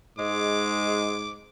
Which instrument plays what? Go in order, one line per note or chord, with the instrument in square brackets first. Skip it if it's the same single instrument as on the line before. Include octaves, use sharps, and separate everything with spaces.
[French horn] G#2 [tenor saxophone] G#3 [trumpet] D6